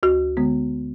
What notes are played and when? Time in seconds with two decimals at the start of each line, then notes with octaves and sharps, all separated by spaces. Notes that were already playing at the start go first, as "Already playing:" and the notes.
0.03 D2 F#4
0.37 D3 G#3 B3